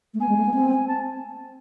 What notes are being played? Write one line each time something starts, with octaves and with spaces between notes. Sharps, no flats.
A3
B3 G#5
G#3
A3
B3
C4
A5